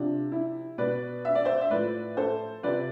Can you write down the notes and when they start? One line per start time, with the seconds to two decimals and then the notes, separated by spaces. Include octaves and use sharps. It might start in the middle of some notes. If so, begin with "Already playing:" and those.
Already playing: C3 F3 D4
0.32 E4
0.78 B2 B4 D5
1.25 E5
1.35 D5
1.45 C5 E5
1.61 E5
1.71 A2 F3 B4 D5
2.17 A4 C5
2.63 C3 F3 B4 D5